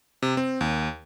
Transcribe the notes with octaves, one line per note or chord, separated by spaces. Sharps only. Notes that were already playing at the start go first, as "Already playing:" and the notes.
C3
C4
D#2